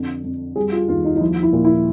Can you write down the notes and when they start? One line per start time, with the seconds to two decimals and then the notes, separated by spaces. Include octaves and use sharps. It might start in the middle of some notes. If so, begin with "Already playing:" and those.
Already playing: F2 D3
0.24 F2
0.56 G3 G#4
0.72 F4
0.88 D#2 F4
1.05 D#4
1.16 D#4
1.21 F3 E4
1.43 E4
1.53 A#2
1.65 E4